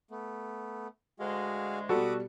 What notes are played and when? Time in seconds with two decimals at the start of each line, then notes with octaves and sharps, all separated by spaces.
0.11 A3 B3
1.19 D2 G#3 F#4 G#4 F5
1.89 B2 G3 F#4 A4 B5 D6 D#6